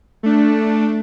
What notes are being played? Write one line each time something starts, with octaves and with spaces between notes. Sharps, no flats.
A3 D4